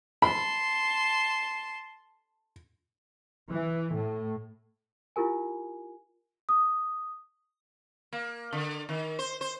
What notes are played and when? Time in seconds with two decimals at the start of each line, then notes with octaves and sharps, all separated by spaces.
0.22 A5 B5 C6
3.51 E3
3.94 A2
5.16 E4 F4 G4 A#4 G#5
6.49 D#6
8.13 A#3
8.53 D3
8.89 D#3
9.19 C5
9.41 C5